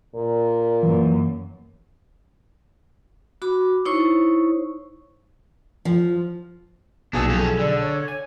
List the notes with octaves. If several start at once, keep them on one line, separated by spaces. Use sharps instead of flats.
A#2
F#2 E3 A#3
F#4 B5 D6
D#4 E4 C5 C#5 C#6
F3
B1 A#2 D4 G#4 E6
F2 C#4 A4
D3 D5
C#5
G#5